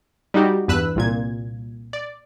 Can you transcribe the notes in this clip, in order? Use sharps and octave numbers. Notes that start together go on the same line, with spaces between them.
G3 D#4 F#4 G4
E2 G2 B4 E6 F#6
C2 A#2 G#6
D5